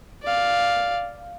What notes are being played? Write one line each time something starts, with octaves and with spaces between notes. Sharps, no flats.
D5 F5